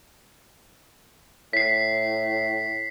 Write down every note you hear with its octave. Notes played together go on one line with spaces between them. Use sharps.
A2 B6 C7